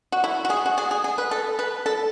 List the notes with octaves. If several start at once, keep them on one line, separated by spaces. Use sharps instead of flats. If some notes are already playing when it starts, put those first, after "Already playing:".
F#4
E4
F#4
G#4
F#4
G#4
G#4
G#4
B4
A4
B4
A4